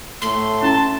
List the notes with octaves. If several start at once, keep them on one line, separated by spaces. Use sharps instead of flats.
A2 A3 C6
C#4 E4 A5